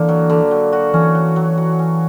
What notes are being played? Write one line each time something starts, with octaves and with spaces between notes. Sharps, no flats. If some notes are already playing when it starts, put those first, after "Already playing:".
Already playing: D3 E3 A#3
F#3
D3
F#3
F#4
E3 C#4
F#3
F#3
F#4
C#4